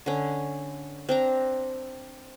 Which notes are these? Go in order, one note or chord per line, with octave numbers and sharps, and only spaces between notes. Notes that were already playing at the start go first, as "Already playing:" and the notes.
D3 C#4
C4 D4 A#5